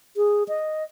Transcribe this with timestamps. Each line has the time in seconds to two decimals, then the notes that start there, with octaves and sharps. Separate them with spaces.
0.17 G#4
0.48 D#5